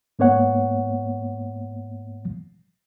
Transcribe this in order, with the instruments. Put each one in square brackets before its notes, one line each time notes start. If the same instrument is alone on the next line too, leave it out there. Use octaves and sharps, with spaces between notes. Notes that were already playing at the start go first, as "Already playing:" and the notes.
[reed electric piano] G#2 A#3 B3 C#5 F#5